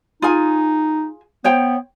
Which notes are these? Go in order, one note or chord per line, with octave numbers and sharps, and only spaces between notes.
D#4 F4 G#4 G#5
B3 C5 C#5 G5